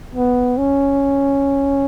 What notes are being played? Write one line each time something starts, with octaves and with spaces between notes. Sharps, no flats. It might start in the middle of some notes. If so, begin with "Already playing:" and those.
B3
C#4